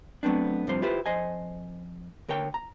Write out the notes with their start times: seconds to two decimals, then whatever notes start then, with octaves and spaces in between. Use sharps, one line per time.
0.23 F#3 A3 B3 C4 D4
0.67 C2 G2 C3 F3 C5
0.82 E4 F4 G4 B4 C5
1.06 F2 C5 D#5 G#5
2.28 D2 A#4 C#5 G5
2.54 A#5